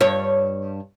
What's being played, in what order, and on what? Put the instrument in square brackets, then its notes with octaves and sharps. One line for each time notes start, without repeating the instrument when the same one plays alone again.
[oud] G2 C#5